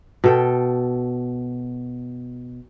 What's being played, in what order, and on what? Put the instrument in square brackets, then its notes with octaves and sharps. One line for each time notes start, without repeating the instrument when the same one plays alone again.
[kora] B2 A4 G5